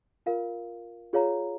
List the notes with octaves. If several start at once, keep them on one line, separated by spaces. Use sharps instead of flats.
F4 A#4 F5
F4 G#4 C#5 F5 A#5